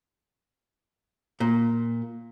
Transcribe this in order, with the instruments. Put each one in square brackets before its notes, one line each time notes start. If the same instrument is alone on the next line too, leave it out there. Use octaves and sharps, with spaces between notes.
[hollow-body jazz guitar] A#2